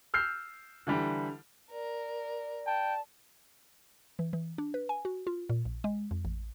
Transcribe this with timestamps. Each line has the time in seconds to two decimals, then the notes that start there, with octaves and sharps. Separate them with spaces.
0.14 E6 F6 G6 C7
0.87 D3 E3 G3
1.71 A#4 D5
2.66 G5 A5
4.19 E3
4.33 E3
4.58 D4
4.74 B4
4.89 G#5
5.05 F#4
5.27 F4
5.50 A#2
5.65 A#1
5.84 G#3
6.11 F2
6.25 A1